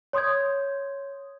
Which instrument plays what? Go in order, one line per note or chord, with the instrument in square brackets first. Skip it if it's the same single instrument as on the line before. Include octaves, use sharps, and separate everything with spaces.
[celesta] C#5 C6 D#6 G6 G#6